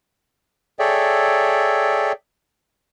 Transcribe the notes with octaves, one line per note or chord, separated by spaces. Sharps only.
G#4 A4 C#5 D5 E5 G5